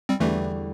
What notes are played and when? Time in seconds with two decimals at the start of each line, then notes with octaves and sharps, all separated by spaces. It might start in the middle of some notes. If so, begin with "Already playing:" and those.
0.09 G3 C4
0.20 E2 D3 E3 G3 A3